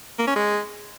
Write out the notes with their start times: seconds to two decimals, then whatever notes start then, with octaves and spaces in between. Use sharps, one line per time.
0.19 A#3
0.27 C#4
0.36 G#3